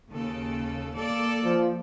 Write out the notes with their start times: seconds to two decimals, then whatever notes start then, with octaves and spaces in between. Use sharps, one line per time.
0.12 D#2 C#3 A4
0.98 A#3 A4 D5
1.44 F3